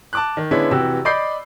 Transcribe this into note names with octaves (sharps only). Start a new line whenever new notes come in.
A5 D6 F#6
D#3
D3 G#3 B3 C#4 D4 E4
F1 C3 E3 F#4 G4 E6
D5 D#5 B5 D6 G6 C7